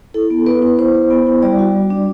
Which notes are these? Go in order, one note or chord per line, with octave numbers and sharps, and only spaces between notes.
E4 A4
B3
B3 B4
E4
E4 C5
B3
B3
E4
G3 D5
F#4
G3
D4